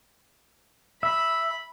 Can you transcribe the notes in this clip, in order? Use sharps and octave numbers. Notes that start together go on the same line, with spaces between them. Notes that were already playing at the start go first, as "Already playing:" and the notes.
E5 B5